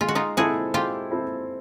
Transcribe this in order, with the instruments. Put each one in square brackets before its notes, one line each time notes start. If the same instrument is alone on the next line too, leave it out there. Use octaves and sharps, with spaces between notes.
[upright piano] G#3 [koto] F4
[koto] F#4
D#4 F4
[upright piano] C4 E4 A4 C5 [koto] F#4 G#4
[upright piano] G#3 [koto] F4 G4
[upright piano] C4 E4 A4 C5